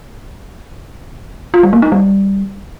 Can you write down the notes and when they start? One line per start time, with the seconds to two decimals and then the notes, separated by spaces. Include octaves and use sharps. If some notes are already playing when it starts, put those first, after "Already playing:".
1.54 F4
1.63 G3
1.73 A#3
1.82 D#4
1.92 G3